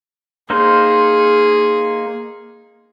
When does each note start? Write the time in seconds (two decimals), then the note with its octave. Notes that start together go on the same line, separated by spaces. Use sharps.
0.50 A#3 D#4 G#4 C5